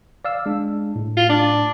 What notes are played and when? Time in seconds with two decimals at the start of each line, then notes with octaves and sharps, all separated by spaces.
0.25 D5 F5 E6
0.46 G#3 D4
0.96 A2
1.17 F4
1.29 D4